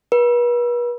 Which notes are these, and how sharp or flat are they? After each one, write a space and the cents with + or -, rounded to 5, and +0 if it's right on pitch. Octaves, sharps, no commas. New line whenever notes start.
B4 -40